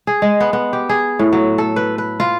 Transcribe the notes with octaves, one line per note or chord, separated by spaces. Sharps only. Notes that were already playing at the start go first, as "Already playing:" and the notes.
G#4
G#3
B3
B3
G4
G#4
A2
F#3
A4
B4
B4
F4